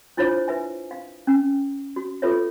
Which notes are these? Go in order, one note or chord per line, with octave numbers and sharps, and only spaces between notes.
D4 E4 F4 C5 C#5
B4 E5 G#5
F5
C#4
F#4
F4 A4 B4 C#5 E5